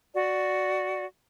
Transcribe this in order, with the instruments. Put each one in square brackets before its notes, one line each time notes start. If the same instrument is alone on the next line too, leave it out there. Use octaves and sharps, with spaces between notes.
[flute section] F#4 D5